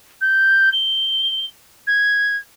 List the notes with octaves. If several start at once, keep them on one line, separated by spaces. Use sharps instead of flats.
G6
G7
G#6